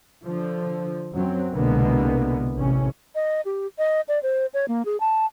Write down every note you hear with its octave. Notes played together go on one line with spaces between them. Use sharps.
D3 F3
F#2 F#3 C4
C2 B2 D3 G#3 A#3 B3
A1 C3 C#4
D#5
G4
D#5
D5
C5
C#5
A#3
G#4
A5